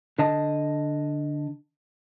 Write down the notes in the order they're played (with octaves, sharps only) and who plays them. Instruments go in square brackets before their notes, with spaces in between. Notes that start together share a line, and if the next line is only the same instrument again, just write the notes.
[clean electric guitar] D3 D#5 A5